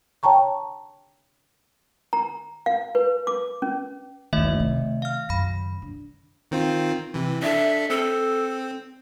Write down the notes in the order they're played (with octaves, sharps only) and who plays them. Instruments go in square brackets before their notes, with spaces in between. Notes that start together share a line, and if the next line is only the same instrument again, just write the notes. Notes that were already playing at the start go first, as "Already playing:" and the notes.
[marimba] C#5 G5 A5 A#5 C#6
[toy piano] A#5
F5
B4
D6
C#4
[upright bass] F#1 E2 [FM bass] D#3 [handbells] A3 D#5 E5
[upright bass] C3
[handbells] F5 F6
[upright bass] F#2 C#3 [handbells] B5 A#6
[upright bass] D3
[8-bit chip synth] D#3 C4 F4
C3 E3
[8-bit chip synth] D4 A4 [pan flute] E5
[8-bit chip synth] C4 [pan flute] A4